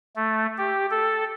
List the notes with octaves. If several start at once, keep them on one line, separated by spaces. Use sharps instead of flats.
A3
G4
A4